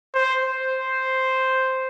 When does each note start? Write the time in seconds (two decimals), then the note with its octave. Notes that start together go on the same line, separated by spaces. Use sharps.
0.14 C5
0.43 C5